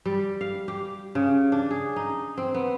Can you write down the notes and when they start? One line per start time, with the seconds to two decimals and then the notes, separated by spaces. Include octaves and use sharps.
0.05 G3
0.41 F5
0.68 G4
1.15 C#3
1.52 D4
1.71 G#4
1.96 D#4
2.37 C4
2.54 B3